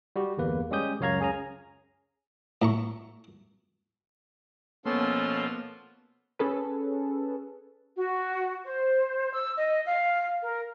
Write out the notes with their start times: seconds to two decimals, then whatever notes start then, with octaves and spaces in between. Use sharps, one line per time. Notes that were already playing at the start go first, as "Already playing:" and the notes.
0.16 G3 F#4 G4
0.37 G1 E2 A#3 B4
0.71 G3 G#3 C#4 G4 D#6 G6
1.00 C#2 F#2 C#5 F5 A#5 G#6
1.20 C#4 G#4 G#5 A#5
2.62 A2 A#5 C#6
4.85 B2 F3 A#3 B3 C#4 F4 A4 C6
6.39 C#4 G#4 A4 B4
7.96 F#4
8.65 C5
9.33 E6
9.57 D#5
9.86 F5
10.42 A#4